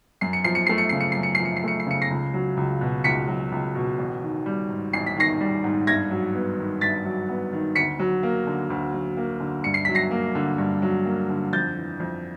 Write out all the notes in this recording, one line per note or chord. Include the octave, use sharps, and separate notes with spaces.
F#2 C7
C#7
F3 C7
C#7
A3 C7
C#7
C#3 C7
C#7
F#2 C7
C#7
F3 C7
C#7
C7
A3 C#7
C7
C#3 C#7
A#6 C7
C#2
F#3
C#2
B2
C#2 B6 C#7
F#3
C#2
B2
A1
D#3
G3
G#2
A1 C7
B6
D#3 A#6 C7
G3
G#2
G2 G#6 A#6
F#3
B3
D#3
G2 A6 B6
F#3
B3
D#3
D2 B6 C#7
F#3
A#3
D3
D2
F#3
A#3
D3
G2 C#7
C7
F#3 B6
A#6 C7
A#3
D3
G2
F#3
A#3
D3
F2 G6 A6
E3
F2